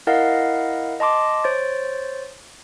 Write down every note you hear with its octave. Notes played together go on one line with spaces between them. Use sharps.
E4 A#4 D#5 F5 F#5
D#5 A5 C6 D6
C5 C#5 A6